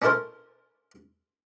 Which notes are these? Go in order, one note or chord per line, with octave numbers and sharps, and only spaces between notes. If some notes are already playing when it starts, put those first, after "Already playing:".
C#4 D4 E4 A4 A#4 C5